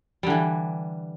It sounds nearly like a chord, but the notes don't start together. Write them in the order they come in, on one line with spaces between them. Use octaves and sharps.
G3 D3 E3